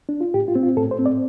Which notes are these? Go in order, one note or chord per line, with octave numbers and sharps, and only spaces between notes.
D4
F4
A2 G4
F4
C4
F4
A2 A4
C5
C4
D5